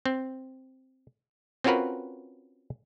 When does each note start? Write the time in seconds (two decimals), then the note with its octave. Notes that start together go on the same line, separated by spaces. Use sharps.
0.06 C4
1.64 C4 C#4 F4 F#4 A#4 B4